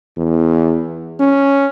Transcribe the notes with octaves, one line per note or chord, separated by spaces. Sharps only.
E2
C#4